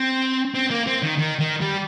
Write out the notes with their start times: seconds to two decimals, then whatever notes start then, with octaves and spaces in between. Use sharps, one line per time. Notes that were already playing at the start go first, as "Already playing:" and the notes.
Already playing: C4
0.54 C4
0.70 A#3
0.87 C4
1.02 D#3
1.18 D#3
1.39 D#3
1.61 G3